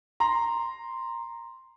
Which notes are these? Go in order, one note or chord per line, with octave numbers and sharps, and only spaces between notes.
A#5 C6